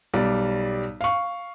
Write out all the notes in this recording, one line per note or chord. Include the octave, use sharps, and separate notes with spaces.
B1 G3 D5
F5 C#6